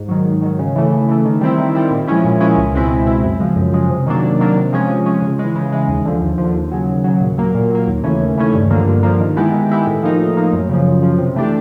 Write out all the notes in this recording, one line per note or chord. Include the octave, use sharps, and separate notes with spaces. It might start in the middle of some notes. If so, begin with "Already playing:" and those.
Already playing: G#2
D#3 F#3
G#2
D#3 F#3
C#3
E3 A3
C#3
E3 A3
D#3
G3 C4 E4
D#3
G3 C4 E4
A#2
F3 G#3 C#4 E4
A#2
F3 G#3 C#4 E4
C#2
B2 G#3 C4 E4
C#2
B2 G#3 C4 E4
F#2
C#3 F3 G#3
F#2
C#3 F3 G#3
C3
D#3 F#3 A#3 D4
C3
D#3 F#3 A#3 D4
C3
F3 G#3 C#4
C3
F3 G#3 C#4
C#3
E3 G#3
C#3
E3 G#3
D#2
D3 F3
D#2
F3
D3
D#2
C#3 F#3
D#2
C#3 F#3
A#2
F#3 A#3
A#2
F#3 A#3
D#2
C#3 E3 A3 C#4
D#2
C#3 E3 A3 C#4
G2
D3 F3 A#3
G2
D3 F3 A#3
D#3
G#3 B3 E4 G4
D#3
G#3 B3 E4 G4
A2
F3 A#3 D#4
A2
F3 A#3 D#4
F#2
C#3 F3
F#2
C#3 F3
C3
E3 A3 D4 G4